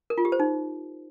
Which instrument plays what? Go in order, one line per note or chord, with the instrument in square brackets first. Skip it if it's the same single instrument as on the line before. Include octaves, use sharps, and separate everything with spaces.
[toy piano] A#4
F4
G4
C5
D#4